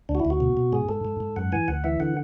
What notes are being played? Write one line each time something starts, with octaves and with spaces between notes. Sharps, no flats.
D2 D4
F#4
E4
D2
F#4
B2
B2
G#2 G#4
G#2 A4
G#2
G#2
F#2 F#5
E3 G#5
D2 F#5
E3 E5
D3 F#5